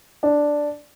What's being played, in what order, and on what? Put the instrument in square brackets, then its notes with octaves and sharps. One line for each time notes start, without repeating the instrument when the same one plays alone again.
[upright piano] D4